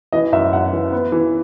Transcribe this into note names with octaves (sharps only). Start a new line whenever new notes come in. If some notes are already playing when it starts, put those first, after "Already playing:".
E3 D#5
F#2 E5
F#2 F#5
E3
B3
E3